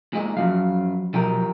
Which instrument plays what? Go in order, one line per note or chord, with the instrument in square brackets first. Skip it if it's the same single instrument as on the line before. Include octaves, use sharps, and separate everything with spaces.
[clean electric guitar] A#2 G#3 D#4
[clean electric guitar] F#2 F5 [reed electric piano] F3 F#3 F#4
[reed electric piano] B2 F#3 [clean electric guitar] F3 G4 A#4